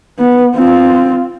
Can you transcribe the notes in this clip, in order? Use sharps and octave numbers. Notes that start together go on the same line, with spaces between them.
B3
C4 F4